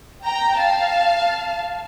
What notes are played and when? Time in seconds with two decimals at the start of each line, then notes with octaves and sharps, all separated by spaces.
0.24 G5 A#5
0.60 F5 A5